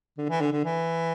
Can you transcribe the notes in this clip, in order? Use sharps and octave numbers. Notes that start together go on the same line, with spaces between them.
D3
E3
D3
D3
E3